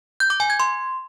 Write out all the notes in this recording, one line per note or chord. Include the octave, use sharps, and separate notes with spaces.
G6
D6
G#5
G#6
C6